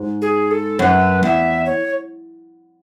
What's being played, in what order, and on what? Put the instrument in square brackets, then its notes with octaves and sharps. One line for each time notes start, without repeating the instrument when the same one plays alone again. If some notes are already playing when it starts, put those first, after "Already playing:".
Already playing: [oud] G#2
[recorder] G#4
A4
[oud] F#2 [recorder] B4 C#5
[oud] E2 [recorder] E5
[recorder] C#5